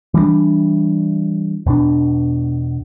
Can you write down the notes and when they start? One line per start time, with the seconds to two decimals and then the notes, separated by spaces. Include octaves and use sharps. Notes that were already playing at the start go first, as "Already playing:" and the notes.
0.14 E3 G3 G#3 D4
1.66 E2 B2 D4